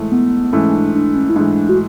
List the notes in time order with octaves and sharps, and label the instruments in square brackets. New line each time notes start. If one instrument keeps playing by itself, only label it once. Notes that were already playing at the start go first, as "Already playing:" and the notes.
Already playing: [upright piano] G#2 E3 A3
[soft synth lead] B3
[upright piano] G#2 E3 A3 [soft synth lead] C#4
[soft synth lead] D4
D4
C#4
E4
[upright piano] G#2 E3 A3 [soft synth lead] D4
[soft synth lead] F#4